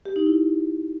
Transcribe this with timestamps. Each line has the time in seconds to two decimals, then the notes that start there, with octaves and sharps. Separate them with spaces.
0.06 G4
0.16 D#4
0.26 E4